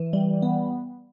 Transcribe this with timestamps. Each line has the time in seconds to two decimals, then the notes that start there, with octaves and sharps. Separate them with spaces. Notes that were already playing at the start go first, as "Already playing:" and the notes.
Already playing: E3
0.13 G3
0.42 B3